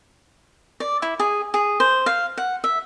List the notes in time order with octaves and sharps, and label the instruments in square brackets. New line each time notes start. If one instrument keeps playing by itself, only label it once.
[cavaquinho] D5
E4
G#4
G#4
C5
F5
F#5
E5